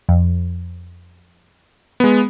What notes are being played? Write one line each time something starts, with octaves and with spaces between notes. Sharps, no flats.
F2
G#3 B3